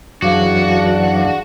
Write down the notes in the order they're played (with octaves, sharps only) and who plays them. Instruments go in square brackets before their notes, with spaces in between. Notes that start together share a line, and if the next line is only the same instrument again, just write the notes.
[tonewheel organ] F#2 E3 F#3 [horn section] D4 [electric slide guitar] F#4 [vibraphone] G#4 F5 D6